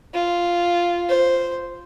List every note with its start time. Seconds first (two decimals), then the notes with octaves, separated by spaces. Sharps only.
0.14 F4
1.09 C5